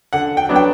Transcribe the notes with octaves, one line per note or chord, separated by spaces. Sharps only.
D3 F#5
G5
F#3 B3 D4
G5